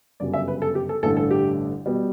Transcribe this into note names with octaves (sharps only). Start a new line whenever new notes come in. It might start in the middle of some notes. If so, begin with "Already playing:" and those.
G1 F#2 C#3 G3 D5
E5
B4
A4
G4
A4
A1 G2 D3 A3 A4
A4
G4
B2 G3